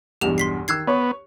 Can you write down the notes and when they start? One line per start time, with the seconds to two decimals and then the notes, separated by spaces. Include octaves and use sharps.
0.21 B1 E2 G2 G4 F7
0.38 C6 B6 C7
0.68 D#3 E6 F#6 G#6 C7
0.88 B3 C#5 C#6